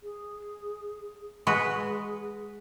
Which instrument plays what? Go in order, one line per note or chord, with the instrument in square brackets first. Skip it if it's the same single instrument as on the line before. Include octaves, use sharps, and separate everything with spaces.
[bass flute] G#4
[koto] G#3 F#4 B4 [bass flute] G#4